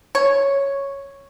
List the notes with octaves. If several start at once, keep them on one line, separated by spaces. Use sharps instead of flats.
C#5